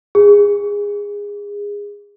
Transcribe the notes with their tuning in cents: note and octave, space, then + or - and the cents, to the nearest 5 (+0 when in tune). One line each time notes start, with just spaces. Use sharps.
G#4 -20